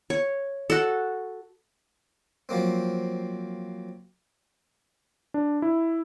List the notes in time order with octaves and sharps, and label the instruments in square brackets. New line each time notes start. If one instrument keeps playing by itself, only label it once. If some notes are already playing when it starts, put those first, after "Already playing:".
[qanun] C#5
F#4 A4
[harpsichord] F3 F#3 A#3 C4
[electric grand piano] D4
E4